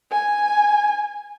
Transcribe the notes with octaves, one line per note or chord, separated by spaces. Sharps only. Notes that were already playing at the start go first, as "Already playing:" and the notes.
G#5